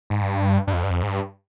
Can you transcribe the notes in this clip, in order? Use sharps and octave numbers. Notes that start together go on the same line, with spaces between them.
G#2
G2
G2
F2
G2
F2
G#2
G2